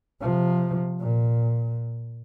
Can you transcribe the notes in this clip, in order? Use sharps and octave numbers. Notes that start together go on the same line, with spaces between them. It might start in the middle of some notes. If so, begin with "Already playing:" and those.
C3 F3
A#2